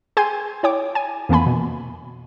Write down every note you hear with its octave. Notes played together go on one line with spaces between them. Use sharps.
G#4 G5 G#5 C6 G6 G#6
E4 C#5 G5 D6
G#5
F2 E3 A#3 B3 G#5 B5
B2